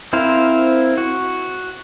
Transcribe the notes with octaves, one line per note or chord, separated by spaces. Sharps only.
C4 E4 A#4 C5 F5
F#4